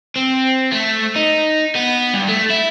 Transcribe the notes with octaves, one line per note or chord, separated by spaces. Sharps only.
C4
A3
D#4
B3
G2
A3
E4